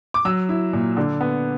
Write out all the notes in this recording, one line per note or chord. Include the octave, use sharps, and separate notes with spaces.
D6
F#3 E6
E4
A#2
D3
B3